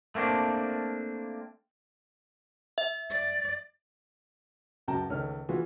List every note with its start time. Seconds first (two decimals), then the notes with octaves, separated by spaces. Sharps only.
0.15 A3 A#3 C4 D4
2.78 E5
3.11 D5
4.88 C#2 F#2 F#4 G5 A5 A#5
5.10 C#2 D#3 A3 C#4 F6
5.49 E3 B3 F4 F#4 G#4